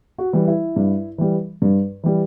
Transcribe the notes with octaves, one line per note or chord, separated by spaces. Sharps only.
F#4
E3 G3
E4
G2
E3 G3
G2
E3 G3